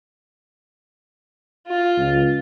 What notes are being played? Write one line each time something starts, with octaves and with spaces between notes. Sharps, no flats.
F4
C#2